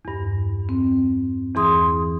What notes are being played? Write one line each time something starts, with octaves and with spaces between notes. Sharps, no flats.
E2 G2
C4
E2 E3 G#4 C6 D#6